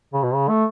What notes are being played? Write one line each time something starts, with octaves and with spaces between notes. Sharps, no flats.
C#3
B2
C#3
A3